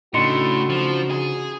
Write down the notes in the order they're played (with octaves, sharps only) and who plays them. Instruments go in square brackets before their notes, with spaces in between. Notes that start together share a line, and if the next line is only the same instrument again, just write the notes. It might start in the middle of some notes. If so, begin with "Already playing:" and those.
[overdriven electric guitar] A2 [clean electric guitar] C#3 D4 D#4 [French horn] F#4 [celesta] C6 C#7
[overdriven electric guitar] F3
G#4